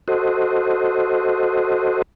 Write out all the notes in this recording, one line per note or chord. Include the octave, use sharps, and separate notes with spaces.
F#4 A4 C5 D#5